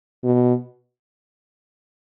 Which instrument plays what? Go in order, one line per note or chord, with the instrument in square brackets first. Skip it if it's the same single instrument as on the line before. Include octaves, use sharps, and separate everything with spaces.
[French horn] B2